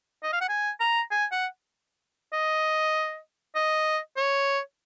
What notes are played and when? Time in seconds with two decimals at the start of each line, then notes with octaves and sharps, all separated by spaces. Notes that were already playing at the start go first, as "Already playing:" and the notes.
0.23 D#5
0.32 F5
0.41 F#5
0.49 G#5
0.80 A#5
1.11 G#5
1.32 F#5
2.33 D#5
3.55 D#5
4.17 C#5